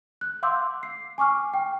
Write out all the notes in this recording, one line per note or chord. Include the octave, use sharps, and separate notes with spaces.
F#6
F5 F#5 C6 D6 E6 G6
C7
G#5 C#6 D6 F6
G5